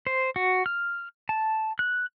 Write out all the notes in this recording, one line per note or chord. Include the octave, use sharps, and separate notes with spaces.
C5
F#4
F6
A5
F#6